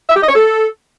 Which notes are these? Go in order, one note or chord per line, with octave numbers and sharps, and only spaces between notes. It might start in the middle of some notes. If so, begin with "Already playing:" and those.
E5
G4
D#5
C#5
A4